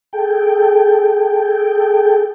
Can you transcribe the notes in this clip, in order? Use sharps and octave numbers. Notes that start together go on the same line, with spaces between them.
G#4 A4 G5